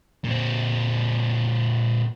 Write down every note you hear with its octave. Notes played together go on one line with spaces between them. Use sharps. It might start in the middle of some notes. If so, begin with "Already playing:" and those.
A#2 C4